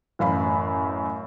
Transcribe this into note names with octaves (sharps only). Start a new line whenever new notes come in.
A1 F#2 F5 B5